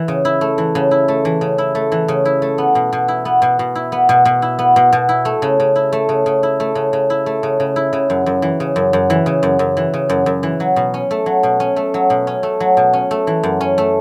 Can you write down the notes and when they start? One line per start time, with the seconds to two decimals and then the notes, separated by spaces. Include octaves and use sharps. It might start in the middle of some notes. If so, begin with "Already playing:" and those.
Already playing: E3
0.08 C#3
0.25 E4
0.41 A3
0.58 E3
0.75 C#3
0.91 E4
1.08 A3
1.25 E3
1.41 C#3
1.58 E4
1.75 A3
1.92 E3
2.08 C#3
2.25 E4
2.42 A3
2.58 B3
2.75 B2
2.93 B2
3.08 E4
3.25 B3
3.42 B2
3.59 B2
3.75 E4
3.92 B3
4.09 B2
4.25 B2
4.42 E4
4.59 B3
4.76 B2
4.93 B2
5.09 E4
5.25 A3
5.42 C#3
5.60 C#3
5.76 E4
5.93 A3
6.09 C#3
6.26 C#3
6.43 E4
6.60 A3
6.75 C#3
6.93 C#3
7.10 E4
7.26 A3
7.43 C#3
7.60 C#3
7.76 E4
7.93 C#3
8.10 F#2
8.26 F#2
8.42 E3
8.60 C#3
8.76 F#2
8.93 F#2
9.10 E3
9.26 C#3
9.43 F#2
9.59 F#2
9.77 E3
9.94 C#3
10.10 F#2
10.26 F#2
10.43 E3
10.60 F#3
10.76 B2
10.94 C#4
11.11 A3
11.26 F#3
11.43 B2
11.60 C#4
11.76 A3
11.94 F#3
12.10 B2
12.27 C#4
12.43 A3
12.60 F#3
12.77 B2
12.93 C#4
13.11 A3
13.27 E3
13.43 F#2
13.61 C#4
13.78 A3